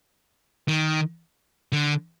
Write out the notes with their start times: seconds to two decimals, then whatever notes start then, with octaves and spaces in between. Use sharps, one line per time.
0.68 D#3
1.72 D3